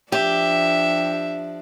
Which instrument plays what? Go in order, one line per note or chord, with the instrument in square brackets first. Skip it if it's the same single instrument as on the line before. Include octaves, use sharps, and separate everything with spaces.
[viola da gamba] F3 D4 [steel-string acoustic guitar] G4 [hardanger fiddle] E5